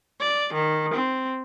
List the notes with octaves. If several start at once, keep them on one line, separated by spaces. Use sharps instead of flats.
D5
D#3
C4